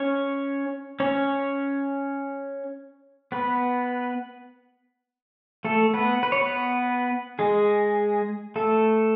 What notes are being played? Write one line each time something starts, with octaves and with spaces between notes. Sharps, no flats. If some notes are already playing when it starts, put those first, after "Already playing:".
Already playing: C#4 C#5
C#4 C#5
B3 B4
A3 A4
B3 B4
B4
C#5
B3 B4
G#3 G#4
A3 A4